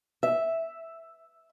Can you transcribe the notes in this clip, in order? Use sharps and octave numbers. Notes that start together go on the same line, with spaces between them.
E5